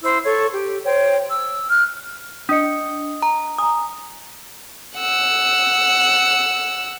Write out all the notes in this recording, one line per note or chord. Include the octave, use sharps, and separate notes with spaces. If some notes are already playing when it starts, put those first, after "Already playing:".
E4 C5 E6
A4 C#5 C#6
G4
C5 C#5 G5
E6
F6 F#6
D4 D#5 D#6 C#7
A#5
G#5 A#5 D#6
F#5 E6